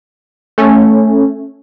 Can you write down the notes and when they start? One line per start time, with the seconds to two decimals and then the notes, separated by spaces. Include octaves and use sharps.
0.58 A3 C#4